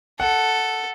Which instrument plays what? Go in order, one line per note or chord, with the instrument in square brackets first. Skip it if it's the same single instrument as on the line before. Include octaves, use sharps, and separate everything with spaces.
[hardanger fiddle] A4 [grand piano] F#5